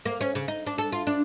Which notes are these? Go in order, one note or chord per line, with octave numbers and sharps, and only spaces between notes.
A#3
C#4
C#3
D#4
D4
A4
F4
D4